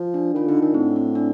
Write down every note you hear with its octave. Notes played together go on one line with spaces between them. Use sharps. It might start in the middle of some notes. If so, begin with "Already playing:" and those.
Already playing: F3
D4
D#3 F4
D3 D#4
D#3 D4
A2 C4
C4
D4